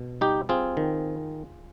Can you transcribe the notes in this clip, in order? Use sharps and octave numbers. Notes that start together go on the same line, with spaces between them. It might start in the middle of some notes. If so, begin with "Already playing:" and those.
Already playing: B2
G3 D#4 G4
C4 F4 G#4
D#3